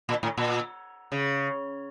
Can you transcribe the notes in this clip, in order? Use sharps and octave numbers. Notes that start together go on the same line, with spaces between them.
A#2
A2
A#2
C#3